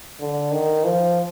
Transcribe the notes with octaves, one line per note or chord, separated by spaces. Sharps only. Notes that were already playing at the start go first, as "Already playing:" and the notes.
D3
D#3
F3